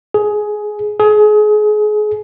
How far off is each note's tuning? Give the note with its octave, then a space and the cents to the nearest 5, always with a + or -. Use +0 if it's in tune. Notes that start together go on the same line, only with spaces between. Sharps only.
G#4 +15
G#4 +30